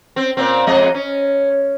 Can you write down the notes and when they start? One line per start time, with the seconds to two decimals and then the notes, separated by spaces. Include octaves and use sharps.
0.16 C4
0.37 A#2 C4
0.67 F2 G#3 D#5
0.94 C#4